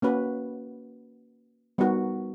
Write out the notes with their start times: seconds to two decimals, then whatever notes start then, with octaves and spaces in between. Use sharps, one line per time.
0.02 A#3 C#4 F#4 B4
1.78 G3 B3 D#4 F#4 A#4